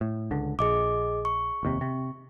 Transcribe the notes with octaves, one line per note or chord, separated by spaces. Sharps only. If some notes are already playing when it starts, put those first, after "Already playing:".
A2
C#2 D3
A#1 G#4 D#5 D6
C#6
F1 D#2 C3
C3